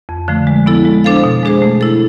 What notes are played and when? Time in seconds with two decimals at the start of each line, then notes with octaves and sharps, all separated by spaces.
0.09 F2
0.28 D3 F3 A3
0.47 G#3
0.66 B3 E4 A4
0.85 G#3
1.04 D4 A4 C5 F5
1.24 B2
1.43 G#3 D4 G#4 C5
1.62 A3
1.81 E4 A4